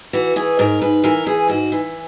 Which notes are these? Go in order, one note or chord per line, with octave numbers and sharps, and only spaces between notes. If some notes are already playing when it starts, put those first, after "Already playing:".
E3 F#4
E3 G#4
G#2 A#4
G#2 B4
E3 A#4
E3 G#4
G#2 F#4
E3